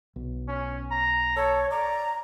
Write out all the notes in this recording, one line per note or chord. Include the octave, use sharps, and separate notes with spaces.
B1
C#4
A#5
A4 C#5
D5 A#5